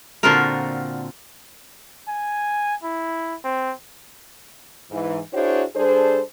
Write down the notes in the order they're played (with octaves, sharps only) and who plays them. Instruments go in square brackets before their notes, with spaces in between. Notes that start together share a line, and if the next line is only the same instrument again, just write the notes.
[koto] A#2 D3 C4 F4 F#4 A#4
[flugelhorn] G#5
E4
C4
[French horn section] G#2 E3
D4 E4 F#4 G#4 C5 C#5
G3 D4 G#4 A4 C5